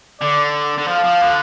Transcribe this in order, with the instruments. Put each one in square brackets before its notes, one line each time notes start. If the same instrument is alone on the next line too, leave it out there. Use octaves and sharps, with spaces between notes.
[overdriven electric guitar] D3 [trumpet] D5
[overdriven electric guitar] D3
[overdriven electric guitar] F3 [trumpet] F5
[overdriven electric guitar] F3
D3